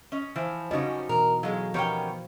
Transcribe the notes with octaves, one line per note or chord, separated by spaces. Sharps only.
C#4 D#5
E3 F3
C#3 F3 G3 C#4 D#4 F#4 D#5
B2 E3 A#4
A2 F#3 G#3 F5
D#3 F3 B3 C#4 G4 C#5 G5